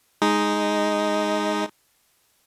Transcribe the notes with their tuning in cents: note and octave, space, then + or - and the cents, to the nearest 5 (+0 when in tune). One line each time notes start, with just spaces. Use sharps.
G#3 +0 D#4 +0